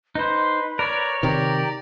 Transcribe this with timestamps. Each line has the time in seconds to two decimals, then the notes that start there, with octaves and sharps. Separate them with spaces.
0.15 D#4 B4 C5
0.79 A#4 C#5 D5
1.23 C3 D#3 G4 D5 A#5